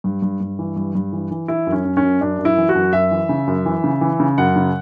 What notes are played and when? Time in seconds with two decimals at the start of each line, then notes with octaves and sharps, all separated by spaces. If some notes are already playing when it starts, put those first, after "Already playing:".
0.04 G2
0.22 G2
0.41 G2
0.59 E3
0.76 G2
0.95 G2
1.13 E3
1.31 E3
1.48 E3 E4
1.67 F#2
1.72 C#4
1.85 F#2
1.97 C#4
2.03 F#2
2.21 F#2 D4
2.39 F#2
2.45 E4
2.57 E3
2.69 F#4
2.75 F#2
2.93 F#2 E5
3.11 E3
3.29 C#3
3.47 F#2
3.66 E3
3.84 C#3
4.01 E3
4.20 C#3
4.38 F#2 F#5
4.56 C#3